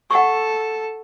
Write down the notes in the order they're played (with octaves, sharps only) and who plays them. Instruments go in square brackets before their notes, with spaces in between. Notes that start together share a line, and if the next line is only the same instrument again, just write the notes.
[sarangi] A4 [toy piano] F#5 C#6